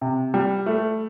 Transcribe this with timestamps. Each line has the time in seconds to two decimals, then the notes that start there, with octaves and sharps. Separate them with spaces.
0.01 C3
0.34 G3
0.66 A3